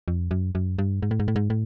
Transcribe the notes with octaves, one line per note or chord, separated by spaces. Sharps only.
F2
F#2
F#2
G2
G#2
A2
G#2
A2
G#2
A2